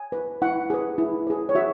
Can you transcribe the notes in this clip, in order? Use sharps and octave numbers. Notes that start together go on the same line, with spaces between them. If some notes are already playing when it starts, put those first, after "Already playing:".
Already playing: G#5
B4
E4 F#5
G#4 B4
E4
G#4 B4
C#5
F#4 E5